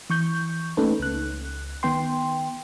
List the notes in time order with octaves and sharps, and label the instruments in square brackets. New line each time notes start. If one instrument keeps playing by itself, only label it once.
[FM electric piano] E3 C#6 G6
A3 A#3 C#4 D#4 A4 B4
C#2 F#6
D#3 B3 G5 C6